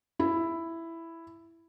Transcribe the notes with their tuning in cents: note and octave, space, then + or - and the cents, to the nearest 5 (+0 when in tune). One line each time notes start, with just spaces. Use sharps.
E4 +5